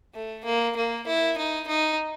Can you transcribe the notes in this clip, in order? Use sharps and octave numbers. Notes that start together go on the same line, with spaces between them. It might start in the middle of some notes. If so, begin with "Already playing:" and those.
A3
A#3
A#3
E4
D#4
D#4